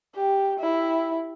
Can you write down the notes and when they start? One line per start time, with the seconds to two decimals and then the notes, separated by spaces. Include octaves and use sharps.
0.15 G4
0.59 E4